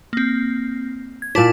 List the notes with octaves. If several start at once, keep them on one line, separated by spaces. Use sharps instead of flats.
A#3 C4
G#6
A#2 E4 D5 A5